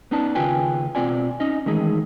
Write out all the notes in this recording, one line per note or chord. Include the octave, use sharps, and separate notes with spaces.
B3 C#4 D#4 D5 A5
D#2 C#3 F4 B4 G5 G#5
B2 A3 C4 F4 D5 G#5
C#4 D#4 D#5
D#3 E3 G#3 A3 D#4 G#4